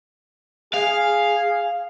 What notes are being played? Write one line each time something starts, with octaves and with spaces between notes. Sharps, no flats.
G#4 F5